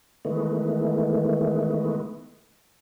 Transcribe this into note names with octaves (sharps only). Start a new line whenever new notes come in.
D#3 E3 G#3 A3 B3